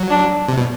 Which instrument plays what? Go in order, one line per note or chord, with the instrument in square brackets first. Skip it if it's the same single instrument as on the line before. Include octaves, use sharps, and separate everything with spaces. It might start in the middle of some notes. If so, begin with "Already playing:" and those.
Already playing: [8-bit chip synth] F#3
[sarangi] D4
[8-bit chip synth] C3
B2